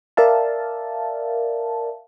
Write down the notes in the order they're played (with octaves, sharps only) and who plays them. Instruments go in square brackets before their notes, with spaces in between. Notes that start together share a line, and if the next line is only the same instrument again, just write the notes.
[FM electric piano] A#4 D5 E5 F5 A5